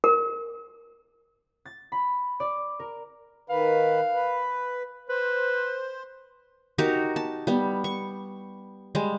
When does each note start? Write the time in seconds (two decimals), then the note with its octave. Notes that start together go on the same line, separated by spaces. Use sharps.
0.04 A#4
1.65 A6
1.92 B5
2.40 D5
2.79 A#4
3.50 D#3 B4 F5
4.14 B4
5.09 B4 C5
6.78 D#4 F#4 G4 A#4
7.16 A5
7.47 G3 B3
7.84 C#6
8.95 G3 G#3